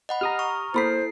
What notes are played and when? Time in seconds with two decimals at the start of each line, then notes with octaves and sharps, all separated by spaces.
0.09 D#5 F#5 B5
0.21 G4 A#5 D#6 F6
0.39 C#6
0.74 A#3 E4 A4 C5 B5 B6 C7